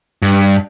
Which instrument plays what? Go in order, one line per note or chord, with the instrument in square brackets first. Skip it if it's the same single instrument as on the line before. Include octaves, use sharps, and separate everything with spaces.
[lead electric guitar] G2